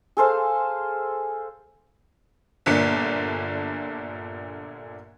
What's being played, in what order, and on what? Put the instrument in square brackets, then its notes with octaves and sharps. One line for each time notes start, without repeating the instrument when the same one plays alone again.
[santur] G#4 A4 C5 F5
[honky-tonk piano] G1 A#2 D3 D4 B6 C#7